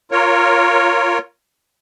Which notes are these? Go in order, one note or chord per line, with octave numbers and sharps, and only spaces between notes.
F4 A#4 C#5